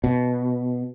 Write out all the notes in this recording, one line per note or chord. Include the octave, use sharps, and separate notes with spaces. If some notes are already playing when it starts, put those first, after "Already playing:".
B2